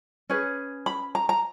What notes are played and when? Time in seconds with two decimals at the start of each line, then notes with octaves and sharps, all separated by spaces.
0.30 C#4 G#4 B4
0.86 B5
1.15 A#5
1.29 A#5